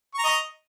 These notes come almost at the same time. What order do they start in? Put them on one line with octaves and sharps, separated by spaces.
C#6 A#5 D#5